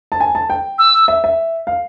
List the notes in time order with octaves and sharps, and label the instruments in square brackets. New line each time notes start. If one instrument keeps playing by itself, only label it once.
[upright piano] A5
G#5
A5
G5
[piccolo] E6
[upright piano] E5
E5
F5